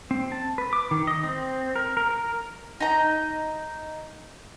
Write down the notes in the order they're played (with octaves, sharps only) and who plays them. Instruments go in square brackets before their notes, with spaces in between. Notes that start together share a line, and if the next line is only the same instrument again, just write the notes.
[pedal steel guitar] C4
A5
B4
D6
D#3
D#5
C4
A#4
A#4
A#4
[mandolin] D#4 A#5